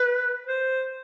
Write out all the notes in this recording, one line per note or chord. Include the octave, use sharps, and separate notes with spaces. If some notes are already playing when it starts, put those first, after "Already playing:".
Already playing: B4
C5